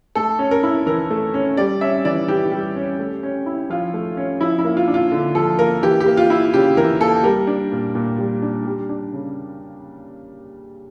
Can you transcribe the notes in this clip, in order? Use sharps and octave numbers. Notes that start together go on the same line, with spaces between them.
A3 A4
C#4
A#4
E4
E3 A#4
A3
C#4
G3 D5
C#4 E5
E3 D5
E3 G4
G3
C#4
A3
C#4
E4
F3 F4
A3
C#4
F3 E4
E4
A#3
F4
D4
F4
D3
F3 A4
A#3 A#4
E3 G4
G4
A#3
F4
E4
C#3 G4
E3 A#4
A#3 A4
G3 A#4
D4
A#2
A#2
G3
D4
G3
D4
C#3